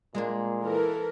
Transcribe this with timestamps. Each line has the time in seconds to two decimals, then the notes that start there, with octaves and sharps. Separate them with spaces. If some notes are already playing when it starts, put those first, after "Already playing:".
0.15 A#2 G#3 A#3 D4
0.62 E3 A4 A#4